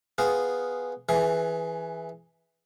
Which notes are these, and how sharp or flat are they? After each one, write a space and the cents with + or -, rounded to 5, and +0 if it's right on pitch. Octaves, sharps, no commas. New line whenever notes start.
B3 +0 F4 +0 G#4 +0
E3 +0 G#4 +15